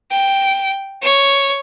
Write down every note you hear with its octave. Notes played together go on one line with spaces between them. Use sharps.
G5
C#5